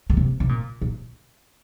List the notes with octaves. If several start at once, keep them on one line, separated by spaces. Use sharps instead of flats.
D3
C3
C3
A#2
A#2